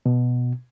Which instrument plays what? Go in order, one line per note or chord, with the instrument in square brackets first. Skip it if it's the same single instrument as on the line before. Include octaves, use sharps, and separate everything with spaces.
[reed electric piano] B2